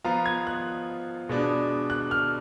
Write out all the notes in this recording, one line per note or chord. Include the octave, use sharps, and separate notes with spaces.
F3 B3 F4 A#5
G#6
F#6
B2 G#3 B3 D4
F#6
F6